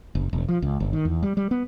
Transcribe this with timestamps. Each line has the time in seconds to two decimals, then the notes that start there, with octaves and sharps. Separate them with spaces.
0.15 F#1
0.33 E1
0.49 F3
0.62 C#2
0.80 G1
0.93 D#3
1.05 E2
1.23 G3
1.37 G3
1.51 B3